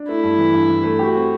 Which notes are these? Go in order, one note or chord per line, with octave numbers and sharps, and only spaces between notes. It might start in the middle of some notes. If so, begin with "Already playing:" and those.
Already playing: D4
A3 E4
G2
E3
G2
E3
A3
F#4 G4
C4